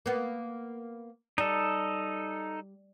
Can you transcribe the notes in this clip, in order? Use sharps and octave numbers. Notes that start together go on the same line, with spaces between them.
A#3 B3
G3 D#4 A4